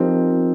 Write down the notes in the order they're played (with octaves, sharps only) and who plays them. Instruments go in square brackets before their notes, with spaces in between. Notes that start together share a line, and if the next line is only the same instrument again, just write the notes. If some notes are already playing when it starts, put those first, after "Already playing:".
Already playing: [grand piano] F3 C4 D#4 G4 A#4